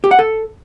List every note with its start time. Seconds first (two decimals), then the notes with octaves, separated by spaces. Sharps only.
0.04 G4
0.11 F#5
0.19 A4